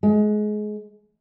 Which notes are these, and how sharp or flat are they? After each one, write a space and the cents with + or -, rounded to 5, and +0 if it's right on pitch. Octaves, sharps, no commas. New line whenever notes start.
G#3 +25